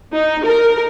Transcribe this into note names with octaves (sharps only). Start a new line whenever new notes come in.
D#4
A#4